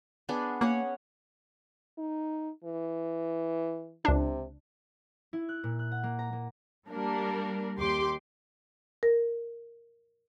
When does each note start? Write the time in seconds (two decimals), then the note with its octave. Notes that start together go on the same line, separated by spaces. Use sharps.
0.29 B3 D4 G#4
0.61 A#3 C#4 C#5 F#5
1.98 D#4
2.64 E3
4.05 C#2 C3 D4
5.33 E4
5.49 F#6
5.64 A#2
5.79 F#6
5.91 F#5
6.03 A#3
6.19 A#5
6.33 A#3
6.88 G3 A#3 D4 A#4
7.78 D#2 G4 C6 D6
9.03 A#4